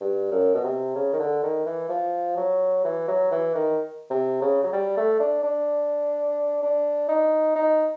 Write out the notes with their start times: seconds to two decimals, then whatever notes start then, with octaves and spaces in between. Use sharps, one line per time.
0.01 G2
0.32 F#2
0.55 B2
0.64 C3
0.95 C#3
1.13 D#3
1.19 D3
1.43 D#3
1.66 E3
1.89 F3
2.37 F#3
2.84 E3
3.08 F#3
3.31 E3
3.55 D#3
4.10 C3
4.41 C#3
4.63 F#3
4.72 G3
4.97 A3
5.20 D4
5.43 D4
6.62 D4
7.08 D#4
7.56 D#4